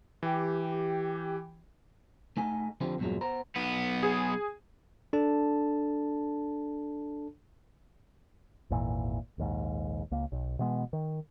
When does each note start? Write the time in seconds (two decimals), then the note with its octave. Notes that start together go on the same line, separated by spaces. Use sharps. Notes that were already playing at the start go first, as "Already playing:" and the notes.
0.23 E3 G4
2.37 A3 D#4 G#5
2.81 D3 F3 C4 G4
2.99 E2 G2 A#2 F#3 G#3
3.21 B3 C5 A#5
3.56 B1 B3
4.03 G#4
5.13 D4 A4 A5
8.70 G#1 E2 A#2 E3
9.38 A#1 D#2 G#2
10.12 C#2 A#3
10.32 B1
10.59 B2 E3 G#3 B3
10.93 D#3